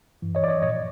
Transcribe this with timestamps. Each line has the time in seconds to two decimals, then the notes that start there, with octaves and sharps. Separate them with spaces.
0.22 G2 E3
0.35 C#5 D#5
0.44 D5
0.48 C#5 D#5
0.62 A#2 C#5 D#5
0.67 F3